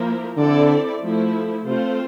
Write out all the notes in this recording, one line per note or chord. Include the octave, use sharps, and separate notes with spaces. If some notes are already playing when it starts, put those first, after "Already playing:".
Already playing: F3 A#3 E4 A#4
D3 C4 E4 A4 D5
F3 A3 E4
C3 A3 C4 F4 C5